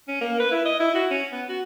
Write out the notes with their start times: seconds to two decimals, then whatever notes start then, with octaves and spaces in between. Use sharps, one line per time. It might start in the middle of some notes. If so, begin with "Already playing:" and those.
0.08 C#4
0.21 A#3
0.40 B4
0.52 E4
0.65 D#5
0.80 E4
0.95 F#4
1.11 C#4
1.32 B3
1.49 F#4